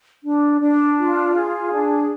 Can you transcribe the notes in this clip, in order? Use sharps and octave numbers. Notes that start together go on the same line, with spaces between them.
D4
D4
F4
G#4
D4